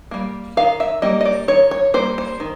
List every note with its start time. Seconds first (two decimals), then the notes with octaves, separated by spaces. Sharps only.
0.11 G3 A#3
0.57 D#3 F5
0.80 E5
1.02 G3 A#3 D#5
1.21 D#5
1.25 D5
1.48 D#3 C#5
1.71 C#5
1.94 G3 A#3 C5
2.18 C5
2.40 D#3